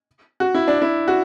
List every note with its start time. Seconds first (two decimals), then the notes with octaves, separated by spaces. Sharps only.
0.40 F#4
0.55 E4
0.68 D4
0.82 E4
1.08 F#4